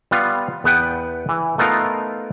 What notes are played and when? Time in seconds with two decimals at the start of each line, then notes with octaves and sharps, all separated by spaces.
0.11 G3 B3 F4
0.64 E2 B3 B4 F#5 G5
1.29 E3
1.58 A3 B3 D#4 F4 A#4